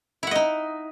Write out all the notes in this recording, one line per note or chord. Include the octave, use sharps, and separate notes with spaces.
D#4 E4 D#5 F#5